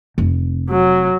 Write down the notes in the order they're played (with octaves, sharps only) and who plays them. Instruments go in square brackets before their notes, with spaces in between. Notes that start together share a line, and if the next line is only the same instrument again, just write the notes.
[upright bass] F1
[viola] F#3